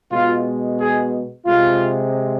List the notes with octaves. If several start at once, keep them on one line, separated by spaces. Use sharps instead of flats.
B2 G#3 F4
G#4
C3 G#3 F4